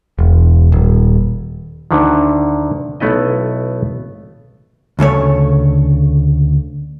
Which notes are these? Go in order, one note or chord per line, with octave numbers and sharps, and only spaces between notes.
E1
D#1
D2 D3 D#3
B1 A3 B3 E4 D#5
D2 C#3 A3 C#5